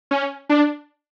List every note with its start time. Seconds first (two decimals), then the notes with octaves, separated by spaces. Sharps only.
0.11 C#4
0.49 D4